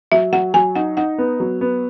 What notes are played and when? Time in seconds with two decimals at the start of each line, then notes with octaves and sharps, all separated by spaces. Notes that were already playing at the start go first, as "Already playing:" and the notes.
0.12 F#3 E5
0.32 F#3 F#5
0.54 F#3 G#5
0.75 D#4 F#5
0.97 D#4 F#5
1.18 B3
1.40 F#3
1.61 B3